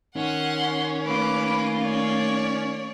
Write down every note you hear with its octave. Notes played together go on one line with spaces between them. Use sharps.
D#3 C#4 F#5 C6
A3 A#3 F4 B4 D6
C#5 D5